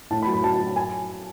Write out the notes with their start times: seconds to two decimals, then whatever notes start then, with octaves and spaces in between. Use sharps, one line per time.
0.11 A2 A5
0.22 B5
0.27 F#3
0.34 B5
0.43 F#3 A5
0.60 F#3
0.76 G#5